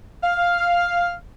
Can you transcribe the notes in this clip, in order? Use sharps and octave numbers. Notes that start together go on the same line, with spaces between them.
F5